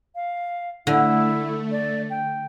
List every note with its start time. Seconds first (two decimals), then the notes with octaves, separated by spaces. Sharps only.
0.15 F5
0.87 D3 A3 E4
1.71 D5
2.10 G5